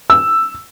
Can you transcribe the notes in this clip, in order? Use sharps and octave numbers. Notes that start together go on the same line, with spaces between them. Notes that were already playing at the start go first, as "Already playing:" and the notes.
E6